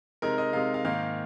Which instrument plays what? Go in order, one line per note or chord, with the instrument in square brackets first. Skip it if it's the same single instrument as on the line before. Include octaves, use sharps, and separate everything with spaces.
[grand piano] C3 G#3 D#4 A#4
D#5
C3 G#3 D#4 F5
F5
G#2 D#3 A#3 D#4 F5